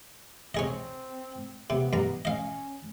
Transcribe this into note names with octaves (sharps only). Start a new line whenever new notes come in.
C4 C#4 G#4 D#5
C3 B3
G2 A#5
C#4 D#5 F5